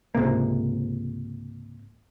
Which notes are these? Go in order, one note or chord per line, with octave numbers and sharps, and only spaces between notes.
C#2 G#2 C3 A#3